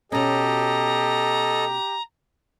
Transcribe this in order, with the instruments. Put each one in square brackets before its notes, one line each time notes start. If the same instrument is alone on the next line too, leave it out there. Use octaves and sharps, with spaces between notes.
[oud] B2 C#4 [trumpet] G4 [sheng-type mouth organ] A4 D#5 [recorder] A#5